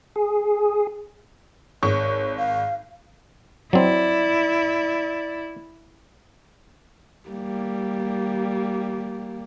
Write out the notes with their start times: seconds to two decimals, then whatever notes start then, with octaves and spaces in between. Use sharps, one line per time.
0.16 G#4
1.83 G#1 C#5 C#6
2.38 F5
3.73 F#3 C4 E4 D5
7.29 G3 A#3